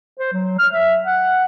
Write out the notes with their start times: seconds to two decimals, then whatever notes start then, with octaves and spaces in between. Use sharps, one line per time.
0.19 C5
0.33 F#3
0.58 F6
0.72 E5
1.05 F#5